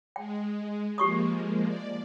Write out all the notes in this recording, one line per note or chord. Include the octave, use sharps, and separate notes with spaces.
G#3 G5
F3 G#3 A#3 G4 C#6 D#6
D5